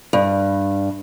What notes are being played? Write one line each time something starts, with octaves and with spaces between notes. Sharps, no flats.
G2